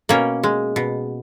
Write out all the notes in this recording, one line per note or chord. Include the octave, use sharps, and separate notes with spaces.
B2 A#3 C#4
G#3
B2